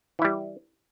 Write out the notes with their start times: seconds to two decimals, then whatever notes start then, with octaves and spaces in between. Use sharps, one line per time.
0.19 E3
0.22 E4
0.25 G3